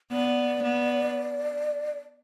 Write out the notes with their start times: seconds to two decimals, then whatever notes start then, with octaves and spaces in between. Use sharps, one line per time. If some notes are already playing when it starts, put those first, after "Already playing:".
0.12 B3 D5
0.63 B3